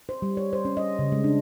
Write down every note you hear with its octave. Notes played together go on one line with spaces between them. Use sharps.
C5
G3
C#5
C5
C#4
D#5
C#3
G#3
D4